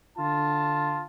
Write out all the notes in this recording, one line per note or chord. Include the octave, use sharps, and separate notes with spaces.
D3 F4 A5